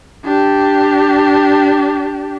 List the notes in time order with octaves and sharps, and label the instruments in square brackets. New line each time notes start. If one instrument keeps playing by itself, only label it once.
[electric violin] D4 G4